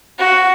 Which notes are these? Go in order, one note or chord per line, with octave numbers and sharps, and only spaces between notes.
F#4